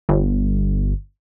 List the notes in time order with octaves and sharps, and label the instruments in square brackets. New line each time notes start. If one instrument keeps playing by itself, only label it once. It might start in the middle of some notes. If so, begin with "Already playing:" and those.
[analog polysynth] G1